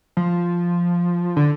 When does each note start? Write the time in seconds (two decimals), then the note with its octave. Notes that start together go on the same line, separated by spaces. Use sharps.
0.17 F3
1.36 D3